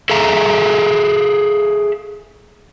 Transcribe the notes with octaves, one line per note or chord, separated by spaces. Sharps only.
G#4 A4 E5 F5 A#5